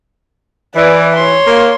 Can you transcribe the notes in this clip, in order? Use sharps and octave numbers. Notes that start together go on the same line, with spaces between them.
E3 B4 D5
C#5 C6
A#3